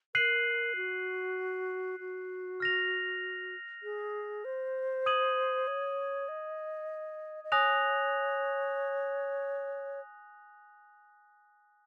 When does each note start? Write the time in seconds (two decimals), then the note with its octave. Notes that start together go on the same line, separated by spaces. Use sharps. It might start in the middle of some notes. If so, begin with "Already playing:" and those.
0.15 A#4 F#6 C7 D#7 F#7
0.76 F#4
2.00 F#4
2.60 F6 A#6 F7
3.83 G#4
4.45 C5
5.06 D#6 G#6 D#7 F#7
5.67 C#5
6.28 D#5
7.44 D#5
7.52 C#5 G#5 D#6 F#6 A#6 F7